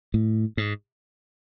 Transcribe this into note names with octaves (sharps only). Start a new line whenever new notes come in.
A2
G#2